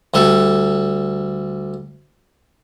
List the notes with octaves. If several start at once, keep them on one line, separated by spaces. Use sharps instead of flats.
D2 G3 A4